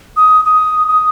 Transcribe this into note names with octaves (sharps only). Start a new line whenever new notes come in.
D#6
D#6
D#6